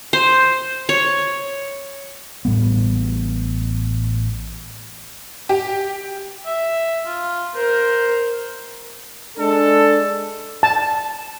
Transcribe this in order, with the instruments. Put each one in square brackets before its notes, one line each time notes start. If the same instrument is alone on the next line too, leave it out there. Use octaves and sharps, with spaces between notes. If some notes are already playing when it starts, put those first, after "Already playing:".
[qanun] C5
C#5
[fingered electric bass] A1 A2 G3 B3
[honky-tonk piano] G4
[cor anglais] E5
F4
[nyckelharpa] A#4 [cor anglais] C5
[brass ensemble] G#3 D4 A4
[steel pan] A5